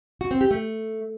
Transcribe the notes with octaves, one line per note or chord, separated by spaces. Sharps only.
F#4
C4
G4
A3